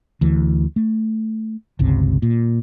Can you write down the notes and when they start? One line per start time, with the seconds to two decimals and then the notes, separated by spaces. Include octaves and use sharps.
0.21 D2 E3
0.76 A3
1.79 G1 C#2 C3
2.22 A#2